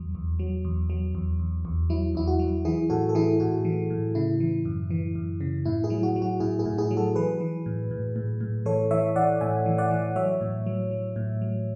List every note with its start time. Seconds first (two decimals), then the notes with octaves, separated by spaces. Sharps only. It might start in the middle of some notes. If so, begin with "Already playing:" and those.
Already playing: E2 F#3
0.15 E2
0.39 F#3
0.65 E2
0.90 F#3
1.15 E2
1.39 E2
1.65 E2
1.90 F#3 E4
2.15 E2 E4
2.28 F#4
2.39 F#3
2.65 E3 E4 G#4
2.90 A2 F#4 A4
3.09 A4
3.15 E3 E4 G#4
3.40 A2 F#4
3.65 E3
3.90 A2
4.15 C#3 E4
4.40 E3
4.65 F#2
4.90 E3
5.15 F#2
5.41 C#3
5.65 A2 E4
5.84 E4 G#4
5.90 F#3
6.03 F#4
6.16 F#3
6.22 F#4
6.40 A2 E4 G#4
6.59 E4 G#4
6.66 A2
6.78 E4 G#4
6.91 F#3
6.97 F#4 A4
7.16 E3 G#4 B4
7.40 E3
7.66 A2
7.91 A2
8.16 A2
8.41 A2
8.66 E3 A4 C#5
8.91 E3 C#5 E5
9.16 E3 D5 F#5
9.41 A2 E5 G#5
9.66 E3
9.78 D5 F#5
9.91 E3
10.16 F#3 C#5 E5
10.41 A2
10.66 F#3
10.91 F#3
11.16 A2
11.41 F#3